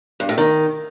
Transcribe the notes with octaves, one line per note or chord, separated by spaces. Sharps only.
G2
A2
D#3